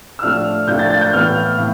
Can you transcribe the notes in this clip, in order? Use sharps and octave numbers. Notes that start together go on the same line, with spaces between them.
E6
A2 F3 A3 D4 F6
A2 F3 A3 D4 G6
A6
A6
G6
A2 E3 B3 F6
A2